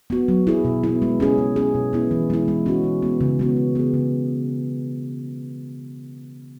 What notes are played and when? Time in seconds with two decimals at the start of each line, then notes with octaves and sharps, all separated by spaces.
0.10 B3 F#4
0.28 F#3
0.47 E4 G#4
0.64 B2
0.84 B3 E4
1.02 G#3
1.20 C#4 G#4
1.38 G#3
1.56 C#4 G#4
1.74 B2
1.93 B3 E4
2.11 E3
2.30 G#3 E4
2.48 G#3
2.66 C#4 F#4
2.84 E3
3.02 G#3 B3
3.21 C#3
3.39 G#3 B3 F#4
3.57 G#3
3.75 B3 G#4
3.94 C#3